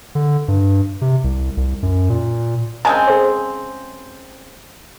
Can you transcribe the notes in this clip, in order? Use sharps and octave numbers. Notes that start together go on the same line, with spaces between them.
D3
G2
C3
C2
C2
F#2
A#2
C#3 G#3 C4 G#5 A5
G#4 C5